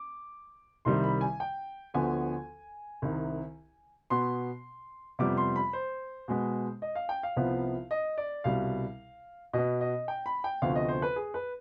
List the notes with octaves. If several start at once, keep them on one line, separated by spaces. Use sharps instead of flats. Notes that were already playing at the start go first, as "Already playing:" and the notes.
Already playing: D6
C2 C3 D#3 G3 C6
B5
G#5
G5
D2 D3 F3 B3 G#5
C2 C3 D#3
B2 B3 C6
F2 C3 G3 B3 D6
C6
B5
C5
B2 G#3 B3
D#5
F5
G5
F5
C2 C3 F3 B3
D#5
D5
C2 B2 G3 F5
B2 B3 D#5
D#5
G5
B5
G5
D2 C3 F3 B3 F5
D#5
C5
B4
G#4
B4